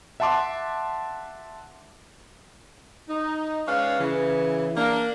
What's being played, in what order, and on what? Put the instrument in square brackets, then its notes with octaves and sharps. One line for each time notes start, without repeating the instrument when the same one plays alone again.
[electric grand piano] E5 F#5 A5 C6 D6
[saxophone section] D#4
G#3 C#4 B4 C#5 D5 F5
C#3 E3
A#3 D4